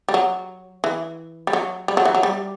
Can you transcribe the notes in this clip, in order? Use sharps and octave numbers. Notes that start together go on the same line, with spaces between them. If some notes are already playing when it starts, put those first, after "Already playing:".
G3
F#3
E3
G3
F#3
G3
F#3
E3
F#3
G3